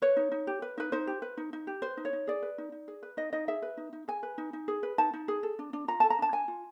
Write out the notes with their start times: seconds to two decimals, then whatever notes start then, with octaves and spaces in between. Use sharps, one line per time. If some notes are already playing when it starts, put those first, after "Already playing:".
0.02 B4 C#5
0.17 D#4
0.32 D#4
0.47 G4
0.62 B4
0.78 D#4 B4
0.92 D#4 C5
1.07 G4
1.22 B4
1.37 D#4
1.53 D#4
1.67 G4
1.82 B4 C5
1.97 D#4
2.05 C#5
2.13 D#4
2.27 G#4 D5
2.43 B4
2.58 D#4
2.72 D#4
2.88 G#4
3.03 B4
3.17 D#4 D#5
3.33 D#4 D#5
3.48 G#4 E5
3.62 B4
3.77 D#4
3.93 D#4
4.08 G#4 G#5
4.23 B4
4.38 D#4
4.53 D#4
4.68 G#4
4.83 B4
4.98 D#4 A5
5.13 D#4
5.28 G#4
5.43 A4
5.59 D4
5.73 D4
5.88 F4 A#5
6.00 A4 A5
6.10 A#5
6.19 D4 A5
6.33 D4 G#5
6.48 F4